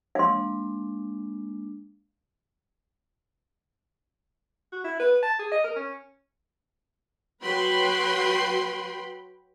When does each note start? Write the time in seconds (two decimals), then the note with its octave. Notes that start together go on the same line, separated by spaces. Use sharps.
0.15 G#3 A#3 D4 F5 C6
4.73 F#4
4.84 E4
5.00 B4
5.23 A5
5.39 G#4
5.52 D#5
5.64 A#4
5.76 C#4
7.42 F#3 F#4 B4 G5 B5 C6